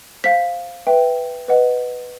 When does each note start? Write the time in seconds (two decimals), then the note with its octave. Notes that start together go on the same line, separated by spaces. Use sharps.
0.24 C5 F5 B6
0.87 B4 E5 G5
1.48 B4 D#5 F#5